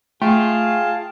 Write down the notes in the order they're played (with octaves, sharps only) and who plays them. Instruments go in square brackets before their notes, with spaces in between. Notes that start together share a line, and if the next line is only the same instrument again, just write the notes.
[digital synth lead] A3 [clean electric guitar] F4 [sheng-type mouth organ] G#4 F5 A5 [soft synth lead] G5